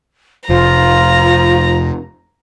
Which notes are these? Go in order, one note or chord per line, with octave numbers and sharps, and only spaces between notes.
F1 F3 F4 A#5